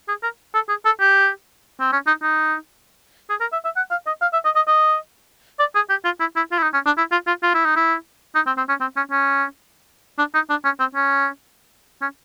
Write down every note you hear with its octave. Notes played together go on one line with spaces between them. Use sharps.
G#4
A#4
A4
G#4
A4
G4
C4
C#4
D#4
D#4
G#4
A#4
E5
E5
F#5
F5
D#5
F5
E5
D#5
D#5
D#5
D5
G#4
G4
F4
E4
E4
F4
E4
D#4
C#4
D4
E4
F4
F4
F4
E4
D#4
E4
D#4
C4
C4
C#4
C4
C#4
C#4
D4
D#4
D4
C#4
C4
C#4
C#4